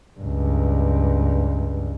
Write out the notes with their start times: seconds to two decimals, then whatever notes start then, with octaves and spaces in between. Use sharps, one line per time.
0.20 C#2 G2